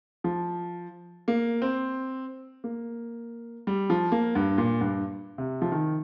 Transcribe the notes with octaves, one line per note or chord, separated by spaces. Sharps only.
F3
A#3
C4
A#3
G3
F3
A#3
G2
A#2
G2
C3
F3
D#3